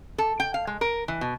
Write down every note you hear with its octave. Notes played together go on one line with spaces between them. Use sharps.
A4
G5
F5
G#3
A#4
E3
B2